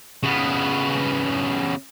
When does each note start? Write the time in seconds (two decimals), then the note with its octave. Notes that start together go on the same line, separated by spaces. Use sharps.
0.23 C#3 B3